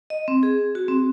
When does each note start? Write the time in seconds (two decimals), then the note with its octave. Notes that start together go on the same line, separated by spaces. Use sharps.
0.10 D#5
0.28 C4
0.43 G#4
0.75 F#4
0.88 C4